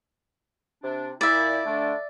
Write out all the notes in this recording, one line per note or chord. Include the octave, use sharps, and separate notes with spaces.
C3 D4
A#2 E4 D5 E5
D3 A3 D4